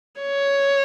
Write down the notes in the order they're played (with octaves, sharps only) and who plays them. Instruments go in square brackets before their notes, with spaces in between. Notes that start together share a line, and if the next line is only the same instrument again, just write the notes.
[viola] C#5